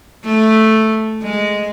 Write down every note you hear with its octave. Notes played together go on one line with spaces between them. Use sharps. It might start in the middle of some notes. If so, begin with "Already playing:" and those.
A3
G#3